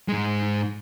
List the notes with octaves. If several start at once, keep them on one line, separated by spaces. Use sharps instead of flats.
G#2 G#3